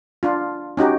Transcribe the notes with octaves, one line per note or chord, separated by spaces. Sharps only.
D4 F4
C#4 D#4 F#4 G4